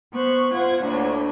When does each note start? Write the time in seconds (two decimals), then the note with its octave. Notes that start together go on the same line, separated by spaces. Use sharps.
0.12 B3 C5 C#6 F#6
0.52 F4 C5 F#5 G#6
0.81 D2 A2 A#3 D4 C#5